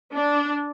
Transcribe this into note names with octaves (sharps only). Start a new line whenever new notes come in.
D4